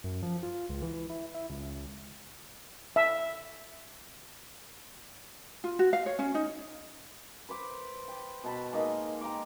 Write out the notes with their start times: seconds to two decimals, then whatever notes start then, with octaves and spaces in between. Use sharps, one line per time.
0.04 F#2
0.23 F3
0.43 F4
0.69 C#2
0.82 E3
0.94 E3
1.10 E4
1.34 E4
1.50 C#2
1.73 C#2
2.96 E5
5.64 F4
5.79 F#4
5.93 F5
6.06 C#5
6.19 C#4
6.34 D#4
7.49 B4 C5 D6
8.08 G5
8.44 B2 A5 B5
8.72 G#3 A#3 D#4 D#5
9.21 G5 A#5 C6 D6